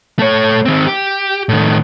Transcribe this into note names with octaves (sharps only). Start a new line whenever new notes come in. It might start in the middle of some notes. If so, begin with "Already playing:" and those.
A3 C#5
D#3 C4
G4
A2 D#3